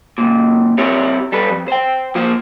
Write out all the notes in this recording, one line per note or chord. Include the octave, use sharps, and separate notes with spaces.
C#2 A#2
C4 E4 G4 A#4 C#5
G3 A4 B4
F2
C5 G5
F3 A#3 F4 C5